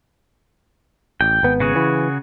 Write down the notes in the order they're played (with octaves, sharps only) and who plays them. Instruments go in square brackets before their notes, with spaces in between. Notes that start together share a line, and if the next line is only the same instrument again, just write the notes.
[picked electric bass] A1 [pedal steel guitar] G5
[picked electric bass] G#1 B3
[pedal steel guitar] C#3 F#4 G#4
[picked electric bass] E3